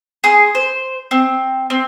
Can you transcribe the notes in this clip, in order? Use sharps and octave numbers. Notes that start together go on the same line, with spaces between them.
G#4 C6
C5
C4
C4